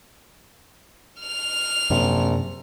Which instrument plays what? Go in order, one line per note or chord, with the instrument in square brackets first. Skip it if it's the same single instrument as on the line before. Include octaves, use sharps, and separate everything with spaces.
[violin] F6 F7
[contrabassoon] A#1 [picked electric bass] F#2 C3